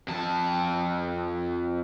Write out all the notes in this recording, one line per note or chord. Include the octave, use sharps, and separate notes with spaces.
F2 A5